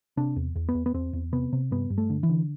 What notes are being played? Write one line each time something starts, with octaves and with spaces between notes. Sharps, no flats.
C3 D4
E2
E2
B3
E2
B3
E2 C4
E2
C3 B3
C3
G2 B3
G2
A3
D3
E3
D3